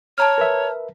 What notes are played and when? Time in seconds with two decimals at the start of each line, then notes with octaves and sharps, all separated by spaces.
0.18 C#5 A5 A#5 F6
0.38 A#4 B4 E5